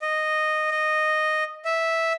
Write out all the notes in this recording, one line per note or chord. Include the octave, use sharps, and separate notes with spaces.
D#5
D#5
E5